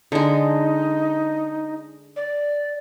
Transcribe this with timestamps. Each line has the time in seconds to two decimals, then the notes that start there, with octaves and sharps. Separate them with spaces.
0.12 D3 G#3 D#4
2.16 D5